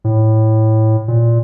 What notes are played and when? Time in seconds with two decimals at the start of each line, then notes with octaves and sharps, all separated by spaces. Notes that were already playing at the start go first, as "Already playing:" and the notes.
0.04 A2
1.08 A#2